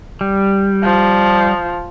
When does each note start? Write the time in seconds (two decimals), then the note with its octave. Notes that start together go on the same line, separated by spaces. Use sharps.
0.21 G3
0.84 F3